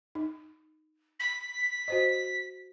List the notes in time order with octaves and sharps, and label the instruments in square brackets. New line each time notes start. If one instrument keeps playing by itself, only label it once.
[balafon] D#4
[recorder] B6
[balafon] F#4 C5 D#5